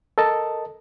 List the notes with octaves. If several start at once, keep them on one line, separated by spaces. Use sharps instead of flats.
A4 A#4 D#5 A5